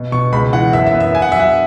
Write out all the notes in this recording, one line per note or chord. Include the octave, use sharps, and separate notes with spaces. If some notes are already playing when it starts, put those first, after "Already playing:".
Already playing: B2
B2 C#6
C#2 B5
E3 F#5
F#2 E5
E5
B3
E5
B3 G#5
F#5
F#3 E5
F#5